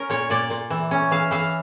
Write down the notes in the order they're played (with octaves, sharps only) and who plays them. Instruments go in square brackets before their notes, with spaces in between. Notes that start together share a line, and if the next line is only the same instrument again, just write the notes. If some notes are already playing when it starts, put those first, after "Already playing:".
Already playing: [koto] C#4 A#4
A#2 C#5
A#2 D5
A#2
E3
C#4
E3 F5
E3 F5